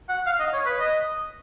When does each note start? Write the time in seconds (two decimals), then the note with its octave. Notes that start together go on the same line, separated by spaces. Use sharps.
0.09 F#5
0.27 F5
0.40 D#5
0.53 C#5
0.66 B4
0.80 D#5